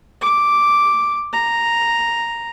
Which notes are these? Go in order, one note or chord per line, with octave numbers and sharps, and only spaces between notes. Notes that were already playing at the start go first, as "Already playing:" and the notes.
D6
A#5